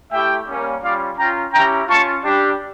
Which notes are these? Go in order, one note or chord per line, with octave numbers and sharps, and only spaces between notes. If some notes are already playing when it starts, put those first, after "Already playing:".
A3 E4 G4 E5 G5
G3 A#3 C#4
G3 C#4 F4 D5 F5
C#4 F4 G5 A#5
C#4 E4 G4 G5 A#5
C#4 F4 A5 C#6
G3 D4 G4